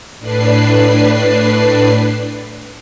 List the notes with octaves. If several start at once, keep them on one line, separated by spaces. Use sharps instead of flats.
A2 D4 B4 C7